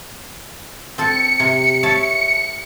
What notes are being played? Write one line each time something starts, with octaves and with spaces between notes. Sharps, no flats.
C4 A4 C#7
C3
C#5 E5 A5